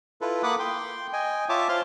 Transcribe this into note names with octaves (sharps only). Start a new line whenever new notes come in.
E4 F4 A4 B4
A#3 F#5 B5 D6 D#6 F#6
G5 C6
D#5 G5 G#5
F4 C#5 E5 A5 D6
F4 C5 C6 F6